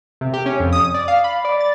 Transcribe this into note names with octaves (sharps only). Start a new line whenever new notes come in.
C3
G4
C#4
F2
D#6
D5
F5
B5
D5
A6